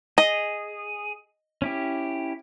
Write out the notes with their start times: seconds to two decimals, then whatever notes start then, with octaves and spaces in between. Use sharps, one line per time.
0.18 G#4 D#5
1.62 C#4 E4 G4